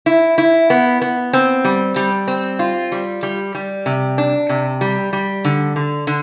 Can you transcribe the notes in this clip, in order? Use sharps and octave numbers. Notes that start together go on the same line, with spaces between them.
E4
E4
B3
B3
C4
G3
G3
C4
F4
G3
G3
G3
C3
D4
C3
G3
G3
D3
D3
D3